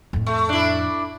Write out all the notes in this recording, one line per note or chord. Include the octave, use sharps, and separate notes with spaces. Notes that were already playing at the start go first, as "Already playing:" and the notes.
F2 A2
A3
D4 E4